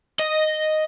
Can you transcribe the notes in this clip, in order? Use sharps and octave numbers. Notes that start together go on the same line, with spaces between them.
D#5